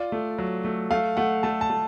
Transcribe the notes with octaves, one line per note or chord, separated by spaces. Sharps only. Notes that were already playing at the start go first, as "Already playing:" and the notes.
Already playing: F4 D5
A3
F#3
A3
A3 F5
A3 F#5
A3 A5
A5
A3